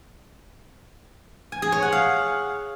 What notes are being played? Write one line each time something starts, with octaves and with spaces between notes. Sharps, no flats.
G#5
G#4
C#5
F#5
F5